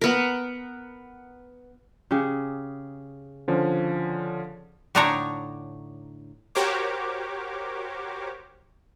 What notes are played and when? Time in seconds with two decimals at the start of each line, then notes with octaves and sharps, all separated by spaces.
0.01 B3 A#4
2.11 C#3 G4 G#4
3.48 D3 F3 C#4
4.95 A2 D3 D4 D#4 C#5 A#5
6.55 F#4 G4 A#4 C5 C#5 D6